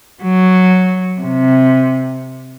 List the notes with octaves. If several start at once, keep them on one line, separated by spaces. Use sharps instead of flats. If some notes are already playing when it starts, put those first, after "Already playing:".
F#3
C3